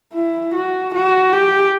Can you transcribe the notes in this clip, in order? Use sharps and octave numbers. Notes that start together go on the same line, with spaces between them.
E4
F#4
F#4
G4